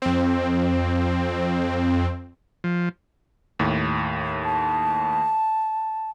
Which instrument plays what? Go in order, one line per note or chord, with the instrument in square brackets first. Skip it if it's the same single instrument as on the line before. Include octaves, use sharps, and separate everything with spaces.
[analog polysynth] F2 C4
[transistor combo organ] F3
[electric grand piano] D#2 A2
[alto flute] A5